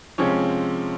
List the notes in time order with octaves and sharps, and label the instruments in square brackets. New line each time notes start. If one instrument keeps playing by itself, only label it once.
[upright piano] C3 F3 G#3 C4 C#4 C#5